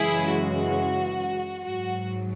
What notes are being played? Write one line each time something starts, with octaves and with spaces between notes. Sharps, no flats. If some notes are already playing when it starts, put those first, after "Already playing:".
Already playing: F#2 C#3 E3 G#3 E4 G#4
F#4
G#2 F#3 F#4